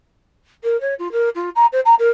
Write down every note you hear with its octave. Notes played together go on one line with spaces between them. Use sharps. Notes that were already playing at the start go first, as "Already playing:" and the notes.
A#4
C#5
F4
A#4
F4
A#5
C5
A#5
A#4